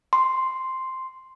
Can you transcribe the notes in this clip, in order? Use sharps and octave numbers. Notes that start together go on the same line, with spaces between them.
C6